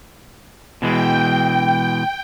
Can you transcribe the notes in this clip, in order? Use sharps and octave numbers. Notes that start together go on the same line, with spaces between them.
B2 E3 G#3 G5